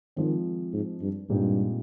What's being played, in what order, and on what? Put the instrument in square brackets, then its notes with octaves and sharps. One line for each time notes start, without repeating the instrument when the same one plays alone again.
[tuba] D#3 [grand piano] F3 G#3 C4
[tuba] G#2
G2
[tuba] G2 [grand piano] A#2 G#3 C4 D#4 G4